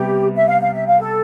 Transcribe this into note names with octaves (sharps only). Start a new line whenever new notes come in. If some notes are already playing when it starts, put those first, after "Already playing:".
Already playing: C3 G3 B3 G4
E5
F5
F5
E5
F5
A4